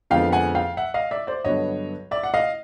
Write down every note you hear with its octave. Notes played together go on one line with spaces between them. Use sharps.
F2 D3 F3 G#3 B3 F5 G5
F#5 G#5
F5 G5
E5 F#5
D#5 F5
D5 E5
C5 D5
G2 D3 F#3 B3 C#5 D#5
D5 E5
F#5
D#5 F5